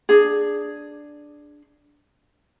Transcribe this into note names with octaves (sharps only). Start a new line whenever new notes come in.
D4 G#4